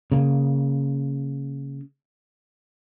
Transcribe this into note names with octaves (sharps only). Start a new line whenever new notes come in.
C#3 A#3